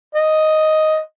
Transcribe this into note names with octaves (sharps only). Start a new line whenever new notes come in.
D#5